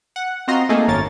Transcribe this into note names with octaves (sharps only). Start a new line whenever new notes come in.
F#5
C4 F4 F#4 D#5 A#5 C6
A3 A#3 D#4 G#4 A4
G#1 F#2 A#4 C#5 A6